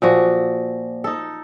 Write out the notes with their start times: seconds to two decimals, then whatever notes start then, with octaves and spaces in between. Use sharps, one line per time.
0.02 A#2 F3 F#4
1.04 D#4 A4